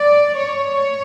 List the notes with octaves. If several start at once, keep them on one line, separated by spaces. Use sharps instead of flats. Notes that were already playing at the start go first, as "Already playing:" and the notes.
Already playing: D5
C#5